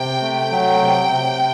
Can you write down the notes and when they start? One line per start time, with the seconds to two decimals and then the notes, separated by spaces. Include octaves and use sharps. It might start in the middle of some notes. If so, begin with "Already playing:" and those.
Already playing: C3 G5
0.22 A3
0.37 G5
0.51 F#3
0.81 C3
1.11 C3